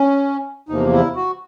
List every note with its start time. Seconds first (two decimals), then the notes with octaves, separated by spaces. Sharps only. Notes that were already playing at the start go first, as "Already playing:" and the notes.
Already playing: C#4
0.69 E2 C3 F3 A#3 D#4
0.93 E4
1.15 F#4